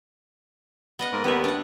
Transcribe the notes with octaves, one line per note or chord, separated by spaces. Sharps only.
B3 D#5 F#5
G#2 A#3 A#4
D#2 G3 B3 E5
D4 F#5